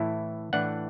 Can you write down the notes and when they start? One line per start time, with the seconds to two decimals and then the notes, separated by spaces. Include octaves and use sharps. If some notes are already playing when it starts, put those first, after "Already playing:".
Already playing: A2 E3 A3 E4
0.53 A2 E3 A3 D4 F#5